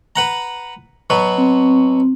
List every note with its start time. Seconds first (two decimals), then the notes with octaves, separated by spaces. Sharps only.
0.16 B4 F#5 A#5
1.10 B2 F#3 B4
1.38 C4